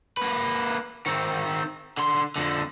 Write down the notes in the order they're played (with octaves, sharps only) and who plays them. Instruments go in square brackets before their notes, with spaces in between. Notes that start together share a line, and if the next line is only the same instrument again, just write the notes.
[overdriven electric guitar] A#3 B4
D#3 C4
D3 C6
F2 D3